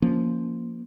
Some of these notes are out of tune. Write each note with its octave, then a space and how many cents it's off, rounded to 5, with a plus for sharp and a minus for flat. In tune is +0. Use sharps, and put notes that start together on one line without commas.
F3 -5 A#3 +0 C#4 +5